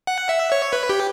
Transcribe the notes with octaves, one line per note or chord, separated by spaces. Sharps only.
F#5
E5
C#5
B4
G4